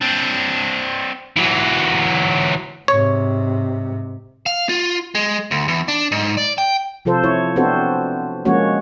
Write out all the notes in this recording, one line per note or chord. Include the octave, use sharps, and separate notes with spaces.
C4 D4
E3 F#3
G#2 C3 C#5
F5
F4
G#3
D2
E2
D4
G#2
D5
G5
C3 F3 F4 A4 C5
E4 C#5
B3 C4 D4 F#4 A4 C5
F3 G#3 A#3 C#4 F#4 C#5